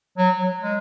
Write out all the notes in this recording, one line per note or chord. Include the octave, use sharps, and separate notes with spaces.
F#3
F#3
G#3